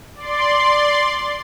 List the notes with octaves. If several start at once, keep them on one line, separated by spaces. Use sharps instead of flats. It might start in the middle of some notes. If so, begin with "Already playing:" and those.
D5 C6